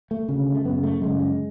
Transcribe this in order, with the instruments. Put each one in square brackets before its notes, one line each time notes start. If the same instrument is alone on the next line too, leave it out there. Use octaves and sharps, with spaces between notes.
[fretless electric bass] A3
D2 C#3
A3
F#2 C#3 B3
A3
F#2 C#3 G#3
G#3